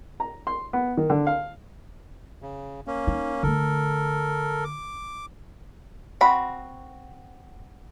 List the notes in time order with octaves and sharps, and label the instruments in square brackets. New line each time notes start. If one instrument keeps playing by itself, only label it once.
[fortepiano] A#5
C6
B3
D#3
D3
F5
[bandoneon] C#3
A#3 C#4
[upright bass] D#4
[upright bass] D3 A3 [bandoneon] A4 A#4
[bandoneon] D6
[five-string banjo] C4 F#4 B5